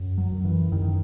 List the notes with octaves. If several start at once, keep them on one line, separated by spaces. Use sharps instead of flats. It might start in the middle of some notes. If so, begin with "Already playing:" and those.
Already playing: F#2
F#3
F#2
E3
F#2 D#3